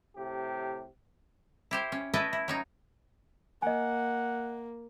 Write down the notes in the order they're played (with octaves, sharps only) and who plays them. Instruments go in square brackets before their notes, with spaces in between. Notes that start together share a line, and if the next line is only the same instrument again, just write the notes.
[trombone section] A2 C3 G4
[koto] E4 G4 C5
C#4
A3 E4 B4 D#5 E5 A5
E4
F#3 C#4 D#4
[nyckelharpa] A#3 [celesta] D#5 G#5 [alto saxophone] F#5